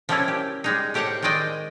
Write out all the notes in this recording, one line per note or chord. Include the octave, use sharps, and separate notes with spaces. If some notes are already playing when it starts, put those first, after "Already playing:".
F3 G3 A#3 C#4 E4 F4
G4
G3 G#3 D#4
A2 G4 A#4 C5 F5 F#5
D#3 G#3 C4 D5 D#5 G5